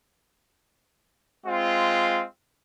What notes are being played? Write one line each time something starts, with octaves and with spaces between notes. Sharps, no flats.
G#3 C4 F4